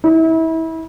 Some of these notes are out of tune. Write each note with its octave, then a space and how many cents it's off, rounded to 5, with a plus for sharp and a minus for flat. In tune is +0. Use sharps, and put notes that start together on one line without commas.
E4 -30